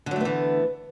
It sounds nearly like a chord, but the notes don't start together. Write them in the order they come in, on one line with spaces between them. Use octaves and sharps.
D3 F#3 A3 B3 E3